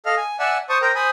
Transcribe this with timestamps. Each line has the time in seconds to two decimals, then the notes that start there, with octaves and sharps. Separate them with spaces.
0.06 A4 D#5 F5 F6
0.17 G#5
0.39 D5 E5 F#5 G#5 A5 E6
0.69 C5 A5 C#6 D#6
0.82 A#4 C5 G5 A#5
0.95 C5 G#5 B5 D#6